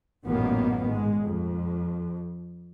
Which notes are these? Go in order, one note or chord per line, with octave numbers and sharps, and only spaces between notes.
A1 F#2 A#2 D#3 A#3 B3
G#2 G#3
F2